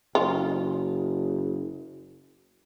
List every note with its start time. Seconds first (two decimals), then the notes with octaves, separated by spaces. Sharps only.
0.15 F#1 F4